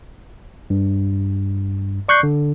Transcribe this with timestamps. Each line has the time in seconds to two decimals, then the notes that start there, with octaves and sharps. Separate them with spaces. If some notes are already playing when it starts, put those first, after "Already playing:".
0.70 G2
2.09 D5 C#6 F#6 G6 C7
2.23 D3